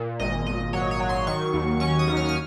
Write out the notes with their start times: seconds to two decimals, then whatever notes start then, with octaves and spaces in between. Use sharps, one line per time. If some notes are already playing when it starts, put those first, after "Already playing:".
Already playing: A#2
0.20 G#1 D#5
0.47 G#1 D#5
0.73 F#3 C#5
0.91 C#5
1.00 F#3
1.09 C6
1.27 D#3 C#6
1.54 D#2
1.80 C#4 C#6
1.99 D#6
2.08 D#2
2.17 F6
2.29 F6